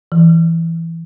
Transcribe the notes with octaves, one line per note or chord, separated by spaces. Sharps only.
E3